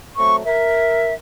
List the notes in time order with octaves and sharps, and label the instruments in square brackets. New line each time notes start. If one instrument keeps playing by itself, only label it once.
[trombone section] F#3 A3 C4 [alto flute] C#6
[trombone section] A#4 [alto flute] E5